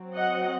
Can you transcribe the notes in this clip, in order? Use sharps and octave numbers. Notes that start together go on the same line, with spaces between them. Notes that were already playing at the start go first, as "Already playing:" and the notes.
Already playing: F#3 C4
D#5 F#5